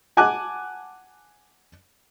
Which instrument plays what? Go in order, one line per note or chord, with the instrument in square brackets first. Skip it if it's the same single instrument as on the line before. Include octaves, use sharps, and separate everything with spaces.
[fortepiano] F#5 G#5 A5 D6 F#6